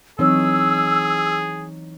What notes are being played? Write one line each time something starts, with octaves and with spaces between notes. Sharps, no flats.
E3 F#3 C4 D#4 G#4 C#5 E6